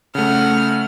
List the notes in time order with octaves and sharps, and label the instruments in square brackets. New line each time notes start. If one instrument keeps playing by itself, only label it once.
[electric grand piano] C#3 A3 [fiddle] F#5 F6